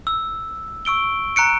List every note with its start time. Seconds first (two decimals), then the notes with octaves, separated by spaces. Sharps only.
0.07 E6
0.85 C#6 E6 D7 G7
1.36 A#5 F#6 C#7 D7